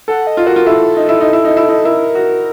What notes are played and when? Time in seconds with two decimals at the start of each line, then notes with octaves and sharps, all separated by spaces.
0.08 A4 F#5
0.27 D#5
0.37 F4
0.47 F#4 A#4
0.56 F4
0.66 E4 A4
0.96 D#4
1.09 E4
1.21 D#4
1.33 E4
1.45 D#4
1.57 E4
1.69 D#4
1.85 E4 A#4
2.15 F#4